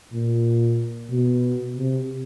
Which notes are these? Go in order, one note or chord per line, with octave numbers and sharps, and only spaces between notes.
A#2
B2
C3